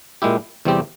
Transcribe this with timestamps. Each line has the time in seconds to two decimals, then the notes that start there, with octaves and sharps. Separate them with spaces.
0.22 A#2 G#3 E4 G4
0.65 E2 C3 G3 C4 G4